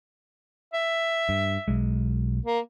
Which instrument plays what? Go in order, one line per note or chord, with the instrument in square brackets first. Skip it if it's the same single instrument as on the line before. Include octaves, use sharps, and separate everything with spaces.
[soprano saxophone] E5
[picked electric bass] G2
B1 G#3
[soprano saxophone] A#3